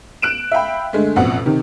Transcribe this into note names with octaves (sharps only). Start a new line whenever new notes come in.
F#6 D7 E7
E5 F5 G5 B5
D3 G#3 A3
A1 F2 B2 F3 F#5
C3 D#3